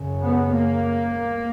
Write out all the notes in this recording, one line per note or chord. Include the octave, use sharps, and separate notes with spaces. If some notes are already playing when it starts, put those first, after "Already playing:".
Already playing: F#2 C#3
B3
A#3